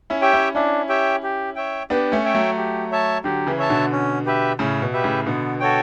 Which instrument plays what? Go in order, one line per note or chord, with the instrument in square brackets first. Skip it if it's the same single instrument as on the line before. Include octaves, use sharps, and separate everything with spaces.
[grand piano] C#4 E4
[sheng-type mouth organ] G4 C#5 E5 G5
[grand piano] C#4 E4
[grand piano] C#4 E4 [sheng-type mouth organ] D4
[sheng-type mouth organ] G4 C#5 E5 G5
G4
C#5 E5 G5
[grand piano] B3 D4 [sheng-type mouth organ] G4
[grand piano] A3 C#4
[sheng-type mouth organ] C#5 E5 G5
[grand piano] F#3 A3
[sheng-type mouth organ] G4
C#5 E5 A5
[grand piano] D3 F#3 [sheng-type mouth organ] G4
[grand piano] C#3 E3
[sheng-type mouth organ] C#5 E5 A5
[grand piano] B2 D3
[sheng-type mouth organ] C#4
G4 B4 E5
[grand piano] A2 C#3 [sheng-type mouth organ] C#4
[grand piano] B2
[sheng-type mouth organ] G4 B4 E5
[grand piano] A2 C#3
[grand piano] B2 D3 [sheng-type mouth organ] B3
[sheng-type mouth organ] F#4 A4 C#5 G5